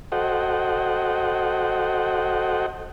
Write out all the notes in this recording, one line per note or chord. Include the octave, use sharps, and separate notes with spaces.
F#4 A4 C5 D#5 F#5 G5